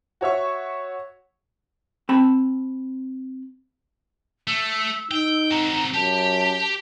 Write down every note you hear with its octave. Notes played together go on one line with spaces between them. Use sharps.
F#4 C#5 E5 C#6
C4 A5 B5
A3 E6
D#4 G5
C4 F#4 A#5
F#2 G4 A5